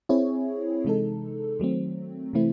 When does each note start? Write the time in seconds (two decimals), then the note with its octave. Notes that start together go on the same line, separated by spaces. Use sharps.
0.09 C4 E4 G#4 C#5
0.85 C3 E3 G#3 D#4 A4
1.60 D#3 F#3 A3 C4
2.33 C3 E3 A3 C4 E4